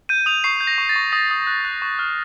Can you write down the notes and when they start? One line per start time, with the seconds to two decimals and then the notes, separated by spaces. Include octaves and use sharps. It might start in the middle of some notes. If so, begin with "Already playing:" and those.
0.09 G6 D#7
0.26 D#6 F7
0.44 C#6 C7
0.60 G6
0.67 A#6
0.78 C#6
0.89 A6
0.96 C#6
1.12 D#6 A#6
1.31 D#6
1.47 F#6
1.64 F#6
1.82 C#6
1.99 F6